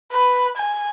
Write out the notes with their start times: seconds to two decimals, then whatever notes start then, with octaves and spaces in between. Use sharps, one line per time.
0.12 B4
0.57 G#5